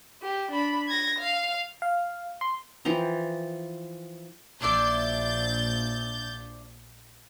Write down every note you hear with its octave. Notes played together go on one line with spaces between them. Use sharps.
G4
D4 B5
G#6 A#6
F5
F5
C6
E3 F3 G5 A#5
A#1 D4 E4 D5 G6 A6